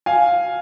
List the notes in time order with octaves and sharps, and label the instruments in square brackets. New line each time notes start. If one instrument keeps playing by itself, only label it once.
[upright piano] F5 G#5